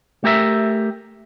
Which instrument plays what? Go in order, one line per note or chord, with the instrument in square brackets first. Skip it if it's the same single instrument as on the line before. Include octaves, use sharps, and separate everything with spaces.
[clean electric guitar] A3 G4 A#4 E5